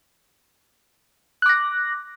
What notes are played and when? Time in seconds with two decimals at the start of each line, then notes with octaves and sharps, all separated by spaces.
1.42 F#6
1.46 D6
1.49 A#6